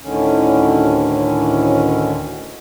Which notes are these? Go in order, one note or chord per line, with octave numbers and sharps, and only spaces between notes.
D2 A2 D3 D#3 C#4